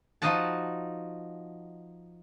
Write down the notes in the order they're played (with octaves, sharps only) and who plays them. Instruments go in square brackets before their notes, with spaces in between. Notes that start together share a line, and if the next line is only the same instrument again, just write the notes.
[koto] F3 D#4 F#4 D#5 F#5 A5